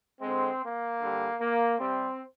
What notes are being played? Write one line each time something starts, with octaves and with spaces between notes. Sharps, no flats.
D3 G#3 C4
A#3
D3 G3
A#3
C3 G3 C4